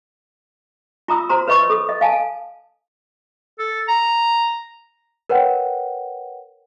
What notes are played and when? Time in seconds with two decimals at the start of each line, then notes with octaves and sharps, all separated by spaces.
1.08 F4 A#5 D#6 E6
1.29 F#4 C5 A#5 C6
1.48 B4 C#5 D#5 B5 C#6 E6
1.70 A4 D#6
1.89 D#5
2.01 F5 G#5 A5
3.59 A4
3.88 A#5
5.29 A#4 B4 C#5 F#5 G5